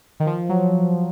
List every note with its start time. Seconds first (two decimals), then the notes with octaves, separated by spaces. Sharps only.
0.20 D#3
0.26 F3
0.49 F#3